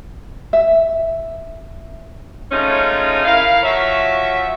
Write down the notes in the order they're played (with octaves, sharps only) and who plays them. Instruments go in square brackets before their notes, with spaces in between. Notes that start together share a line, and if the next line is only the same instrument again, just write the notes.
[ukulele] E5
[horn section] G#3 A3 C#4 D#4 F4
E4 A#4 F5
F3 F#4 C#5 E5